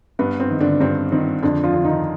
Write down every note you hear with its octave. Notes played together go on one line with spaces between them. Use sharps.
G2 B3
C4
D#3
D3 D4
G2 C4
D#3 C4
F2 D3 D4
F3 F4
D3 F3
D#3 D#4